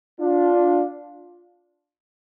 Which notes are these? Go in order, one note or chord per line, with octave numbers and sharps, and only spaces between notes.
D4 F4